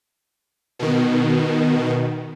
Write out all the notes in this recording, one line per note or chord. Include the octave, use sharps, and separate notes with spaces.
B2 D#3